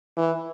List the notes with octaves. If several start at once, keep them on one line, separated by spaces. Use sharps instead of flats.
E3